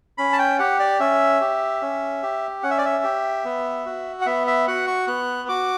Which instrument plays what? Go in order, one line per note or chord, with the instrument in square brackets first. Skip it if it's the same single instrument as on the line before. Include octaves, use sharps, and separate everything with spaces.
[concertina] C#4 B5
A5
G5
G4 F#5
D5
C#4 E5
G4
C#4
G4
C#4 F#5
E5
D5
E5
G4
B3
F#4
F#5
B3 E5
E5
F#4 F#5
C#6
B3 F#6
F#4 D6